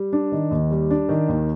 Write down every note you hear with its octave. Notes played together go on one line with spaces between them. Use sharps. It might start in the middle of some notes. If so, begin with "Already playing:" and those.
Already playing: G3
D4
D#3
D#2
G3
D4
D#3
D#2